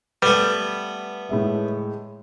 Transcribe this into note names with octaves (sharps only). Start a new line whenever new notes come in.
G3 A3 B3
A2 G#3 E5